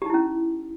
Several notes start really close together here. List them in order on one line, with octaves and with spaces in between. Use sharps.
G4 D#4 E4 C#4